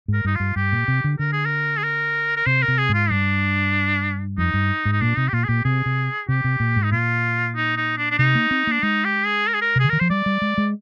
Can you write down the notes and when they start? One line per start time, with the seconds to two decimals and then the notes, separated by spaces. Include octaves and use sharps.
0.08 G#2
0.14 A#4
0.25 G2 D#4
0.35 G2 F4
0.56 G2 G4
0.72 A#2
0.88 C3
1.04 D3
1.19 D3 A#4
1.32 G#4
1.45 A#4
1.77 G#4
1.83 A#4
2.36 A#4
2.46 C3 C5
2.62 A#4
2.68 C3
2.78 G#4
2.89 G#2
2.94 F4
3.10 G2 D4
4.38 F2 D#4
4.54 G2
4.85 G#2
4.92 D#4
5.01 A#2 D4
5.17 C3 D#4
5.28 G4
5.33 A#2 F4
5.44 G#4
5.49 A#2 G4
5.65 C3 G#4
5.86 C3
6.29 C3 G4
6.44 C3
6.60 A#2
6.76 G#2
6.84 D#4
6.92 A#2 F4
7.56 D#4
7.77 D#4
7.97 D4
8.11 D4
8.19 C3 D#4
8.35 A#3
8.51 C4
8.67 A#3 D4
8.83 G#3 D#4
9.04 G4
9.26 G#4
9.47 A#4
9.54 G#4
9.61 A#4
9.76 C3
9.79 D3 G#4
9.89 D#3 A#4
10.00 F3 C5
10.10 G3 D5
10.26 G3
10.42 G#3
10.58 G#3